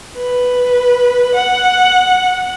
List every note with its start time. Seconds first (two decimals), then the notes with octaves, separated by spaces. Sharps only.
0.17 B4
1.36 F#5